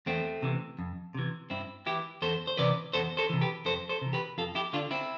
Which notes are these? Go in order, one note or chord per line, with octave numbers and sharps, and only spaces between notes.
E2 A3 C4
C3 E3
F2
C3 E3
G2 C4 E4
E3 E4 G4
E2 A4 C5
C5
C3 E3 B4 D5
E2 A4 C5
A4 C5
C3 E3
G4 B4
F2 A4 C5
A4 C5
C3 E3
G4 B4
F2 F4 A4
E4 G4
D3 D4 F4
C4 E4